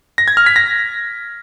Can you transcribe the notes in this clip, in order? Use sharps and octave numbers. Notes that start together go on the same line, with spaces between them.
A#6
G#6
F6
B6
A#6